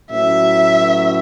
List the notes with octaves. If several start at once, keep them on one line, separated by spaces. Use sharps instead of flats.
A2 F#3 C#4 F#4 B4 E5